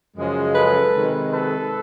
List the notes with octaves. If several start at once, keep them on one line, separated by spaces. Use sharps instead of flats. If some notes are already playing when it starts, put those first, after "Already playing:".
F#2 C#3 F3 G#3
A4 B4
C3 D#3 G#3
A4 B4